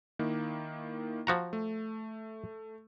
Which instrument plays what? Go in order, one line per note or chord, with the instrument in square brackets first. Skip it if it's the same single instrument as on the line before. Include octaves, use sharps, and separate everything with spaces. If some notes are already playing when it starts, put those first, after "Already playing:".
[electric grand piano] D#3 A#3 E4
[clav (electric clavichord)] F3 F#4 A#5
[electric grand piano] A3